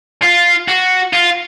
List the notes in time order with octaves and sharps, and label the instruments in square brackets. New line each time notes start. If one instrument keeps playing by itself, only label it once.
[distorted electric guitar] F4
F#4
F4